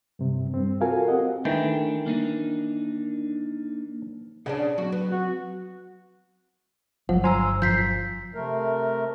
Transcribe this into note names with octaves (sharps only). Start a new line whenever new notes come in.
G2 C3
G2 G3 C4
F4 F#4 A4 A#4 F5 G#5
C4 G4 D#5 F#5
D#3 E3 A3 D4 G5
A#3 D4 D#4
C#3 C#4 D4 G#4 D#5 F#5
G#4
F#3 C4 F#4
B3
F#4
G1 F3 F#3 F#5
C5 G#5 A#5 C6 E6
F#2 F3 G6 B6 C7
C3 A3 A#4